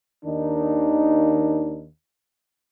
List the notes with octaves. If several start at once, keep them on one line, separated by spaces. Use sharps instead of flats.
D#2 D#3 D4 D#4